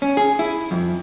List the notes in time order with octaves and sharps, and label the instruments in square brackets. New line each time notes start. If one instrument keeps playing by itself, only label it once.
[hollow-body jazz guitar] C#4
G#4
E4
F2